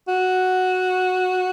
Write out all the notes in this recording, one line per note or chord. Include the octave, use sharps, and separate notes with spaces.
F#4